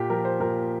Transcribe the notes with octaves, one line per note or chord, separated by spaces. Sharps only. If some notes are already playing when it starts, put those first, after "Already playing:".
Already playing: A#2 G4
F3 A#4
C5
A#2 A#4